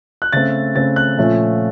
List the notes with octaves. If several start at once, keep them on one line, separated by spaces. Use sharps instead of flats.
F#6
C#3 A3 C4 A6
C#3 A3 C4 A6
F#6
A#2 F3 A3 C#4